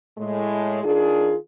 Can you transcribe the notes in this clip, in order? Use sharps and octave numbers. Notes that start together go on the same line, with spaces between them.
A2 G#3
D#3 D4 F4 G#4